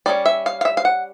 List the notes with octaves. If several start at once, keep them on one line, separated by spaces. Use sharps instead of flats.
G3 A#3 C#4 D5
E5
F5
F5
E5
F5
F#5